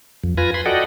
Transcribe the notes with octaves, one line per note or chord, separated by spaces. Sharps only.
F2
F4 B4 G#5 A#6
G#5 B5 C6
F#4 A4 D5 D#5 F#5 G5